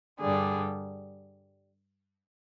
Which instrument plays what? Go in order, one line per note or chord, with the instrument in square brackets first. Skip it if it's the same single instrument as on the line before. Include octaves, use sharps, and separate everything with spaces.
[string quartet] G2 D3 G3 G#4